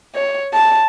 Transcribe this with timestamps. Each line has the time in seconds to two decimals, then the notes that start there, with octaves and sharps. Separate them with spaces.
0.15 C#5
0.54 A5